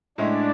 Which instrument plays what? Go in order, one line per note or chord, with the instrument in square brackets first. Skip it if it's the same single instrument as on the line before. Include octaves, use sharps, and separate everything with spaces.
[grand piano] A2 G#3 C#4 E4 [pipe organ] D4